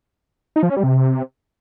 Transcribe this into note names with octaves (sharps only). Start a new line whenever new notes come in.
D#4
F3
C#4
G3
C3